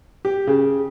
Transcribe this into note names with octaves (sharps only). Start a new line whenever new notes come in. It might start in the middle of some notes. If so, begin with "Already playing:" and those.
G4
C#3